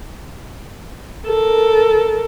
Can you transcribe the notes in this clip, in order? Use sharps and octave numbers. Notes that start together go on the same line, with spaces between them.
A4 A#4